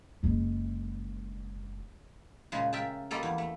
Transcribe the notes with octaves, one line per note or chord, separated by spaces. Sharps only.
F#1 G#3
A#2 C#3 G#3
A#4 E5 G5 A5
G3 A#3 F4 A4 D#5
E2
A3